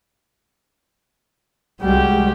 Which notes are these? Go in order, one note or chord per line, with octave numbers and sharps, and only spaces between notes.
C2 G3 G#3 F#4 G4